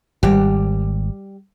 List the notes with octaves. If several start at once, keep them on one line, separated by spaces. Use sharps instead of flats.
G#1 G3 G4